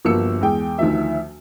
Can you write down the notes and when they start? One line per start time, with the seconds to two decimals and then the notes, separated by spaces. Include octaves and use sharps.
0.05 G1 F3 A#3 F#4 E6 C#7
0.41 E2 G#3 G#4 G5
0.78 D2 D#3 F3 D#4 E5